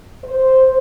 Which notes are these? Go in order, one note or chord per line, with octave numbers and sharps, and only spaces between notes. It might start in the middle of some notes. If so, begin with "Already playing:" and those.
C5